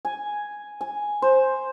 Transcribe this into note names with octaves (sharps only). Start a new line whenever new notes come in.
G#5
G#5
C5